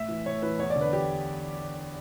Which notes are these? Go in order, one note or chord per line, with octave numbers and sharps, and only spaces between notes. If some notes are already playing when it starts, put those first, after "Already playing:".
Already playing: A2 E5
E3
A2 C#5
E3 B4
E2 C#5
D5
D3
B4
G4